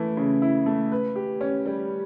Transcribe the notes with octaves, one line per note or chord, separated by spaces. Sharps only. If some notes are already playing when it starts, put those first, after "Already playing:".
Already playing: E3 A3 E4
C#3
E4
A3
B4
G4
C#4
G3